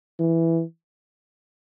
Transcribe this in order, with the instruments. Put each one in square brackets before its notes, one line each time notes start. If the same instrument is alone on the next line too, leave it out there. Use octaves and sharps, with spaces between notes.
[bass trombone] E3